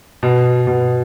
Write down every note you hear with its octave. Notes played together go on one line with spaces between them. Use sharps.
B2
B2